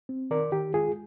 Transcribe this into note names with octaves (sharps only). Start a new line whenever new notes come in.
C4
D#3 A#4 D5
D#3 G4
G#3 F4 G#4